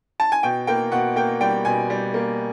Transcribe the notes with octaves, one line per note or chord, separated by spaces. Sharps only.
A5
G#5
B2 G5
A#3 G5
B2 F#5
A#3 G5
G3 G5
B2 G#5
G3
A#3